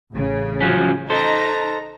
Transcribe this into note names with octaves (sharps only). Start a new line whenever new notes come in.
A1 C#3
F3 F#3 C#4
D#4 A4 C5 A#5